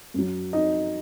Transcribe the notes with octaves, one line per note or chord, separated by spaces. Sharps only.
F#2 F#3
D#4 D#5